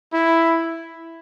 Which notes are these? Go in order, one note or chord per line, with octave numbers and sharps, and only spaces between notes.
E4